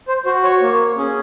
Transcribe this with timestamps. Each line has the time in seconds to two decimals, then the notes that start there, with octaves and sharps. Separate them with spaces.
0.08 C5
0.25 F#4 C5
0.44 C#5
0.62 A#3
0.97 C#4 G#4